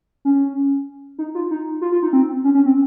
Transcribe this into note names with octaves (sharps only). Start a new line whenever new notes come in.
C#4
D#4
F4
D#4
F4
F4
D#4
C4
C#4
C#4
C4